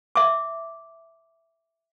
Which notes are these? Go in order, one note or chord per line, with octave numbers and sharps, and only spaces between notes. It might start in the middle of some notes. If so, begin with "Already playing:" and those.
E5 D6